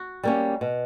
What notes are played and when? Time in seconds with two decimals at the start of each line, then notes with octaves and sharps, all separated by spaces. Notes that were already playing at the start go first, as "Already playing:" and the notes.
Already playing: F#4
0.23 G3 A#3 C#4
0.61 B2